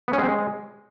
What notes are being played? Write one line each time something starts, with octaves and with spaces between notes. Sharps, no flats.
B3
C#4
G#3
C4
G#3